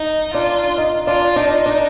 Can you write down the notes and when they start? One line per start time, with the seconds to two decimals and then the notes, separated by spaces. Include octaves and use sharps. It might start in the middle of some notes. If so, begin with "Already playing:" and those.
Already playing: D#4
0.34 D4 F4
0.77 D#4
1.07 D4 F4
1.36 D4 D#4
1.66 D4